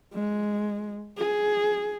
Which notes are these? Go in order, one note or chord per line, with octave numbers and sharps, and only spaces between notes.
G#3
G#4